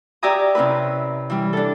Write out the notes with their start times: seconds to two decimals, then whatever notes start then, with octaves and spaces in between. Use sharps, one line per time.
0.23 G4 D5 E5 G#5 A#5 D#6
0.55 C3 C#4 E4 B4
1.30 E3 G3
1.53 D4 A4